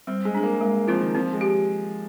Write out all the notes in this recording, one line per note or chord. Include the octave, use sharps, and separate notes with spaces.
G3 C4
G#3
D4 G#4
A#3
G#3 A#3
F3 C4 F4 A#4
D#3
F3 C4
G#3
G4